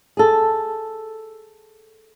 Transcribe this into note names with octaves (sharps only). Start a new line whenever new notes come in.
G#4 A4